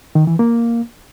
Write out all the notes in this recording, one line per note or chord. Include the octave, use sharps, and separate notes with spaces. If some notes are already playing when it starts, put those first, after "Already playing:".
D#3
E3
A#3